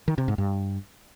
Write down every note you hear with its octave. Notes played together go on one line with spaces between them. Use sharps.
D#3
C3
G#2
G2